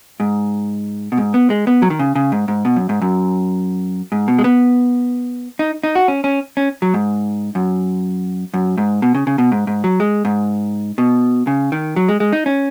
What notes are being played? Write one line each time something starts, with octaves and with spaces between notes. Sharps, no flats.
G#2
B2
G#2
B3
G#3
B3
F#3
D#3
C#3
C#3
G#2
G#2
B2
F#2
G#2
F#2
G#2
B2
G#3
B3
D#4
D#4
F#4
C#4
C#4
C#4
F#3
G#2
F#2
F#2
G#2
B2
C#3
C#3
B2
G#2
G#2
F#3
G#3
G#2
B2
C#3
D#3
F#3
G#3
G#3
D#4
C#4